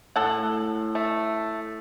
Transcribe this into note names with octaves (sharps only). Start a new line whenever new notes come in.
A2 A4 F#5
A3